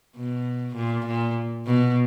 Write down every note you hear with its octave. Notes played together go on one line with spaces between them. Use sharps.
B2
A#2
A#2
B2